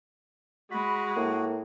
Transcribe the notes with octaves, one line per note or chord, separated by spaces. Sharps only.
G#3 F#4 B5
A2 A#3